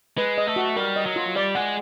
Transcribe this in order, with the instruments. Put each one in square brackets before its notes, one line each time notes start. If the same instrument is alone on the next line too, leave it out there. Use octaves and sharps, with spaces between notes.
[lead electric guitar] G#3 [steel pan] B4
[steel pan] D#5
[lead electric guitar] A3
[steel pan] F#4
[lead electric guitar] G3 [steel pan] A#4
[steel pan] D#5
[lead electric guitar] F#3
[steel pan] F4
[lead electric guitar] G3 [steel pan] D5
[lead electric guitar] G#3 [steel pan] F#5